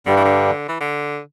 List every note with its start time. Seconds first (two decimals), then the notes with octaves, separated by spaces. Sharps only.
0.06 G2 D3 G3
0.17 E3
0.25 D3
0.69 E3
0.80 D3